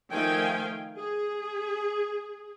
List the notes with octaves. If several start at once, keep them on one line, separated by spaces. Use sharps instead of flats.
D#3 F3 A3 F5 G5 G#5
G#4